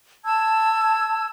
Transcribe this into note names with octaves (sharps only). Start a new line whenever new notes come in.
A5 E6 G#6